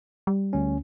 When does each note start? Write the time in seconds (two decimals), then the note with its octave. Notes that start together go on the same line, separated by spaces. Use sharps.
0.27 G3
0.53 D2 C#4